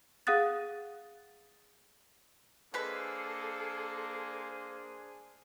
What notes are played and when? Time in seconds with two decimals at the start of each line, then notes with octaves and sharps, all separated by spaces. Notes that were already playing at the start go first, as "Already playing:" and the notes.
0.27 G#4 F5 F#5 D#6 F#6 A6
2.74 G#3 A#3 D4 G#4 A4 B4 C5 B5